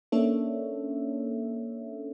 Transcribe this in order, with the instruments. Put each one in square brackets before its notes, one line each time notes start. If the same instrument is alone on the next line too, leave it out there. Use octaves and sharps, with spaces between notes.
[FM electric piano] A#3 C#4 D4 A4 C#5 E5